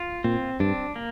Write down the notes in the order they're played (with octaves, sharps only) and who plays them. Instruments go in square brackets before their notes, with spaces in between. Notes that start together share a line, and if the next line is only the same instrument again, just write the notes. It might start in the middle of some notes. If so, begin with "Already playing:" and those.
Already playing: [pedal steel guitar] F4
[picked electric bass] A#2 [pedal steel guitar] C4
[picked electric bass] G2 [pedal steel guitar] D4
[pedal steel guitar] A#3